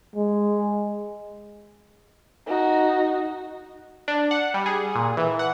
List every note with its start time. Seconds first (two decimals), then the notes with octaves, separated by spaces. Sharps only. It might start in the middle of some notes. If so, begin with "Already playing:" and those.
0.16 G#3
2.46 D#4 F#4
4.08 D4
4.31 F#5
4.54 G3
4.66 G#4
4.95 A#2
5.17 E3
5.39 F#5